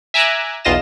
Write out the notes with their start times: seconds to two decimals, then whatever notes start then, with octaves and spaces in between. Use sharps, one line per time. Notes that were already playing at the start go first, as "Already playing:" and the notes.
0.14 E5 G#5 A#5 D6 E6 F#6
0.65 B1 E2 F4 D#5 A#6 E7